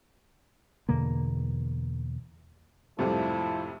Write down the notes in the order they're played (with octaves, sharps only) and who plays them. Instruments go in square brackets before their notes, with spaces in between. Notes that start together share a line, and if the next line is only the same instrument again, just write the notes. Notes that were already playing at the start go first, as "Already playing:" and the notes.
[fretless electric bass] E2 B2 D3 A#3
[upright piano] G#1 F2 A2 [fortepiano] C3 G3 [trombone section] F3 E4 [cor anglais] A4